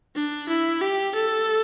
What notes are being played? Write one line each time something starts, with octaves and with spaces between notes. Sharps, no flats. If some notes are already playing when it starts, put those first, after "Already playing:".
D4
E4
G4
A4